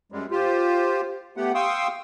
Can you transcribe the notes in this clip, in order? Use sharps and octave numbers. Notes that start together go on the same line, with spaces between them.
F#2 G3 G#3
F4 G4 C5
A3 B3 G4 F#5
F5 G5 C6 C#6 D#6 E6